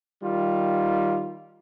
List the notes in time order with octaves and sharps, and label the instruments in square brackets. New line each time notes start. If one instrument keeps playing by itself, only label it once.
[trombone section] D#3 G3 F4